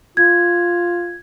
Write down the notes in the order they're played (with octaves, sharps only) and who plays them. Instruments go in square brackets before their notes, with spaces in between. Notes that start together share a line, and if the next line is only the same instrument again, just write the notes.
[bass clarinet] F4 [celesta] G#6